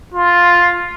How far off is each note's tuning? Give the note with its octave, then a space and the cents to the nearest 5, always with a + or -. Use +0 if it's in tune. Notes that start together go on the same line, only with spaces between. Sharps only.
F4 +5